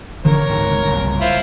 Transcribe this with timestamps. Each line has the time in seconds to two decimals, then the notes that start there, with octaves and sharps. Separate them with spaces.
0.25 C#3 E3 F3 A#4 C#5
0.49 C#2 G#2 D#3
0.85 F#1 C2
1.21 E4 F4 C5